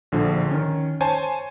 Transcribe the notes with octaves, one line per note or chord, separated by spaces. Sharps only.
A#1 D3 F3
D#3 C#4
C5 C#5 G#5 A5